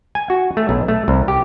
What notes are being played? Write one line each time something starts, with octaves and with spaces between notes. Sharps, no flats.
G#5
F#4
A3
B1
A3
C2
G4